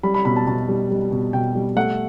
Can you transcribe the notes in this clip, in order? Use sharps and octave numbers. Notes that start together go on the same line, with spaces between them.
G3 B5
B5
B2 B5
A5
B2 A5
G3
G3
B2
B2 G5
G3
A3 F#5